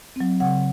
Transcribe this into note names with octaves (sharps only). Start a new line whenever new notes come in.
F#3 C4
C#3 F#5